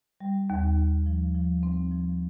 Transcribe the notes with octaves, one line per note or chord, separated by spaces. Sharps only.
G3
D#2
D#2
F3
F3
C4
F3